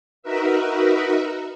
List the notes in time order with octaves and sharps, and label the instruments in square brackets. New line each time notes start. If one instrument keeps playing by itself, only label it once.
[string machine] D#4 F#4 A#4 B4 E5